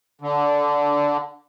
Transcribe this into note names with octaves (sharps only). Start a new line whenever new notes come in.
D3